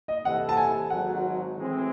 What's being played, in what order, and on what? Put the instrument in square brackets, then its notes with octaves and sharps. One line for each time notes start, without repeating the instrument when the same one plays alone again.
[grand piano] D#5
[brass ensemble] C3 E3 C4 E4 A4 [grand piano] F#5
[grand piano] A5
G#5
[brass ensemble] G#1 G#2 F#3 [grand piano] F#5
[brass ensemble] A2 E3 G#3 C4